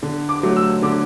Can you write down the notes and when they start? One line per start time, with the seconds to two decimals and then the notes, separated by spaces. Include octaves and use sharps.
0.03 D3
0.29 D6
0.43 F#3 A3
0.57 E6
0.82 D3 D6